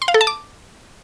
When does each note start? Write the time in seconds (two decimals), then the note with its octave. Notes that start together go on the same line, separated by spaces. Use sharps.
0.02 C6
0.08 F5
0.14 A4
0.21 A5
0.27 D6